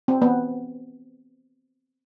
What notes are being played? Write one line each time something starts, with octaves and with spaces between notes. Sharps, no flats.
C4
B3